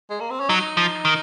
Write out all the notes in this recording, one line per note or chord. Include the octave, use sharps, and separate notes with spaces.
G#3
A#3
C4
C#4
F#3 D#4
F3
D#3